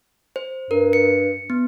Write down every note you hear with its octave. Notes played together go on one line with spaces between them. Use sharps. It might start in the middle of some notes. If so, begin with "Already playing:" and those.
C5
G2 A#4
C#7
B3